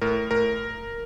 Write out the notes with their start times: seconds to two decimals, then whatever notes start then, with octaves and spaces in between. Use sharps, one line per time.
0.01 A2 A#4
0.31 A2 A#4